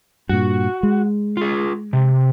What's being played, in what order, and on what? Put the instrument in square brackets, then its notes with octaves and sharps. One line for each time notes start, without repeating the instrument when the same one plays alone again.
[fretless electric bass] G2 A#2 [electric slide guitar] F#4
[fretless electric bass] G#3
[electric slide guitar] F4 G#4
C3